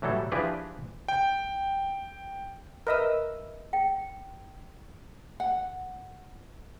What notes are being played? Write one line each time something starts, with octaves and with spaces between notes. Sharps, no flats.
A2 E3 F#3 G3 A4
E3 F3 D4 G4 G#4 B4
G5
A#4 B4 D#5 E5 D#6 E6
G5
F#5